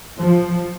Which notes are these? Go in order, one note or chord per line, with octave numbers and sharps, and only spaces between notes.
F3